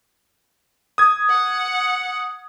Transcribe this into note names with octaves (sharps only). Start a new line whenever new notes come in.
D#6 G#6
F#5